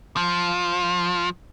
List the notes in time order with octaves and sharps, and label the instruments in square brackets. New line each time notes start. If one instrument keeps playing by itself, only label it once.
[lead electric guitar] F3